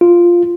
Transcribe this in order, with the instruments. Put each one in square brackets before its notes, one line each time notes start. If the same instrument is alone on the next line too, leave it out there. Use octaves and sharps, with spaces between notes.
[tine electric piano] F4